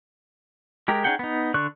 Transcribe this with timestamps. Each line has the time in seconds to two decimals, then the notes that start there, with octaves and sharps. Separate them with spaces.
0.88 G#3 G4 A#4
1.04 C#4 D#4 G#4 F#5 G5
1.19 B3 D#4
1.54 D3 D5 C#6 F#6